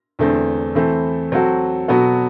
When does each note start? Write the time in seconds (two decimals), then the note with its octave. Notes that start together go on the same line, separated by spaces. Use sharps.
0.19 E2 D3 A3 C4
0.75 E3 A3 C4 E4 A4
1.32 F#3 C4 F#4 A4
1.88 B2 F#3 B3 F#4 A4